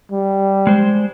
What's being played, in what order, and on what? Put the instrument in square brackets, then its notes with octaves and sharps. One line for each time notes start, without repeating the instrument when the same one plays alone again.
[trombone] G3
[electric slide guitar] G#3 C5